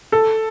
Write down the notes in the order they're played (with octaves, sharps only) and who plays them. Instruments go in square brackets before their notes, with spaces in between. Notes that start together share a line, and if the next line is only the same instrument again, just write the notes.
[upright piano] A4